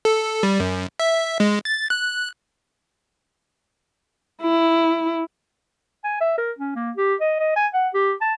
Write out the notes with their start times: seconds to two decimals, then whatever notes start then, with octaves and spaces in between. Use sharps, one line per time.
0.05 A4
0.43 G3
0.60 F#2
0.99 E5
1.40 G#3
1.65 A6
1.90 F#6
4.42 E4
6.04 G#5
6.21 E5
6.38 A#4
6.59 C#4
6.76 A#3
6.97 G4
7.21 D#5
7.40 D#5
7.56 G#5
7.74 F#5
7.94 G4
8.21 A5